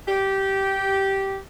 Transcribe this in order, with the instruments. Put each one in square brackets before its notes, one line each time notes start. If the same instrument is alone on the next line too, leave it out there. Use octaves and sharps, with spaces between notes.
[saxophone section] G4